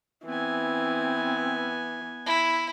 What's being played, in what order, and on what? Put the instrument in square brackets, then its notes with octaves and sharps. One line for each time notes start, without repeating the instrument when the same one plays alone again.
[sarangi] E3 [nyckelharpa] B3 G#5 [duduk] C4
[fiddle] E4